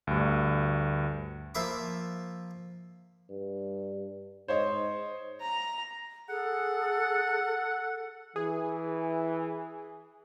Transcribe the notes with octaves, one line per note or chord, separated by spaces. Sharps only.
D2 G2
F3 A#3 E5 B5 D6
G2
G#2 C5 C#5 D#5
A#5
G#4 A4 F#5
E3 G#4